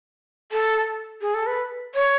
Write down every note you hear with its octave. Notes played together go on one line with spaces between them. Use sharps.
A4
G#4
A4
B4
C#5